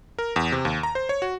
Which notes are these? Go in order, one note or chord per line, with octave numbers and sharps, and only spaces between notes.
A#4
E2
C3
D#2
A#5
C5
C#5
F#4